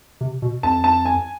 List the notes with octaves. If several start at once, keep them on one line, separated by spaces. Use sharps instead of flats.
C3
B2
F2 A5
A5
G#5